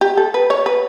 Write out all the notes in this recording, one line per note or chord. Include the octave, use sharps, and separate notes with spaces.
G4
A4
B4
C#5
B4